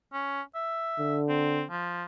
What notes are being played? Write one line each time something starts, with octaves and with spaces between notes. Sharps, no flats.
C#4
E5
D3
C4
F3